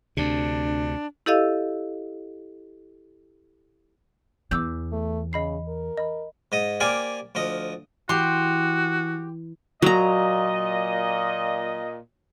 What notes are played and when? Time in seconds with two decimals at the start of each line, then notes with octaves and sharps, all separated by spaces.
0.17 D2 C3 D4
1.26 E4 G4 A4 D#5 F5 E6
4.51 E2 D6 E6 G6
4.92 A3
5.33 C#3 D#5 B5 C7
5.68 A#4
5.97 D#5 B5
6.52 G#2 D#5 D#6
6.80 A#3 G4 C5 D5 F5 G#5
7.35 D2 F3 D#5 D#6
8.09 E3 F#4 G4 C6
9.82 A#2 F#3 D#5 A#5